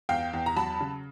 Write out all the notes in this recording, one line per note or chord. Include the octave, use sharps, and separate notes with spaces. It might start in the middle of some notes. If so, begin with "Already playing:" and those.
E2 F5 G5
E2
A#5
F#3 A5 B5
C#3